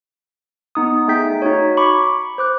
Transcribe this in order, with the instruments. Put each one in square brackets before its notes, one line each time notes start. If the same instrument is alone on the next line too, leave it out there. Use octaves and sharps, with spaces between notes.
[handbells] B3 D#4 D#6
A3 D#4 G#4 G5 G6 B6
D#4 F#4 C#5
B5 C#6 D6
C5 D6 F#6